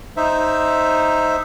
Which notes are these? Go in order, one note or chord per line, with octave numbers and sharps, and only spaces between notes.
D#4 C5 E5